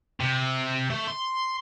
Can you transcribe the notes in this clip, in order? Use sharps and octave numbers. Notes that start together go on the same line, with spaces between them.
C3
A3
C6